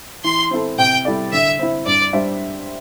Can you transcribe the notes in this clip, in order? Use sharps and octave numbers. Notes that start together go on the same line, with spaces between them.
E3 C6
C4 E4 A4
C3 G5
G3 E4 A4 D5
D3 E5
C4 E4
G2 D5
G3 D4 C5 E5